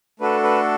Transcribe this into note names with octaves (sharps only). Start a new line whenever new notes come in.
A3 D4 F#4 A4 B4
B4